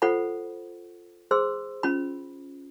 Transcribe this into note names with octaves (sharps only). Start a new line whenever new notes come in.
F4 A4 C5 F#5 B5
G#4 C5 C6 E6
C#4 F4 B5